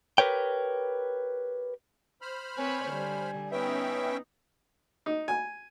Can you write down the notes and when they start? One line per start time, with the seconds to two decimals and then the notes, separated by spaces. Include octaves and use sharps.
0.18 G4 A#4 B4 C#5 G5
2.22 C5 B5 F6
2.57 C4 B4 C#5 G#5
2.89 D3 G3
3.52 B3 C#4 D#4 B4 E5 G5
5.06 D#4
5.28 G#5